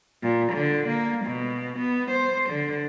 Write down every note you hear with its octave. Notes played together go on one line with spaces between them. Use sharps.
A#2
D3
A#3
B2
B3
C5
D3